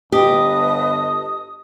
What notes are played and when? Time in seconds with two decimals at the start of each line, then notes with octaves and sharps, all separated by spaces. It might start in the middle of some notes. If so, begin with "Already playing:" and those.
0.12 G1 G4 B4 D#5 A5 D#6